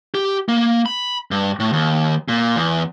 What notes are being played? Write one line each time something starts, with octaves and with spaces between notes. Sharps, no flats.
G4
A#3
B5
G2
A2
D#2
A#2
E2